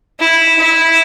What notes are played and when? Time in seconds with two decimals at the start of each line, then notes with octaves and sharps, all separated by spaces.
0.20 E4
0.58 E4